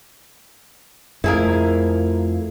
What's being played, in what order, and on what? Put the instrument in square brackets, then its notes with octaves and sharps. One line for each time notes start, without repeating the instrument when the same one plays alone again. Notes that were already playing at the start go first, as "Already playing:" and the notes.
[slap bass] F2 [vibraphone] A3 F5 [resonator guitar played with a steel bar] E4 G#4 A#4